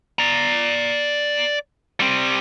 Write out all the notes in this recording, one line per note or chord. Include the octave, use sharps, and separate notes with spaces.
D5 A#5
G3 C4